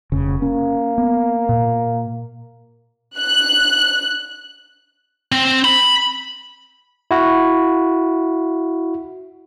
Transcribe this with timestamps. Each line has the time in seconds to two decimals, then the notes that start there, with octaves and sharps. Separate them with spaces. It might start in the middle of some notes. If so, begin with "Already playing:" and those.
0.12 F1 C#3
0.42 A#3 C#4
0.98 B3
1.49 A#2
3.18 F#6
5.32 C4
5.65 B5
7.11 E4 F#4